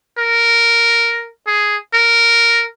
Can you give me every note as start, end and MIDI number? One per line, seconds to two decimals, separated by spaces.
0.18 1.28 70
1.47 1.77 68
1.94 2.64 70